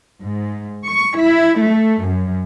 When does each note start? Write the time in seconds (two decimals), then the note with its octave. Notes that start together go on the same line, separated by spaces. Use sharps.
0.23 G#2
0.86 C#6
1.21 E4
1.65 A3
2.05 F#2